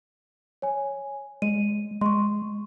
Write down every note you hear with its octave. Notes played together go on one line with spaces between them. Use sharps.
C#5 G#5
G#3 D#7
G#3 C6 C#6